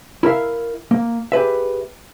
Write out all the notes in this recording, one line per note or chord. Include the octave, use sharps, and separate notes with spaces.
E4 A#4 E5 F5
A#3
G4 G#4 B4 E5